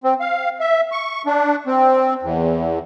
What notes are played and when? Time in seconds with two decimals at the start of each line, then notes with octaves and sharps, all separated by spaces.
0.04 C4
0.20 F5
0.60 E5
0.92 C#6
1.26 D4
1.67 C4
2.23 E2